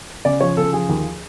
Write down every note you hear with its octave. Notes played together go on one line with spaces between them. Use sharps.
C#3 D5
F3 C#5
C#3 A4
F3 G#4
D#2